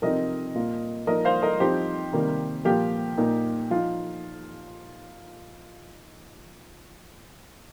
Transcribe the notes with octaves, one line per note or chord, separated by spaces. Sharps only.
C3 F3 C4 D#4 A#4 D#5
A#2 A#3 F4
F3 A#3 D#4 A#4 D#5
C5 F5
A#4 D#5
F3 C4 D#4 G4 C5
C3 D#3 G3 A#3 D#4
A#2 F3 A#3 F4 G4
A#2 A#3 D#4
F3 D#4 F4